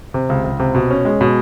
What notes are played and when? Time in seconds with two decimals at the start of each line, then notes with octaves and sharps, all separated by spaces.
0.14 C3
0.29 C#2
0.44 C#2
0.59 C3
0.75 B2
0.91 C#4
1.05 G#3
1.21 B2